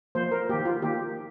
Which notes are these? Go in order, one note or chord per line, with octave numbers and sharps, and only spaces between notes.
F3 A#3 C5
A#4
D#3 A#3 G4
F4
D#3 A#3 G4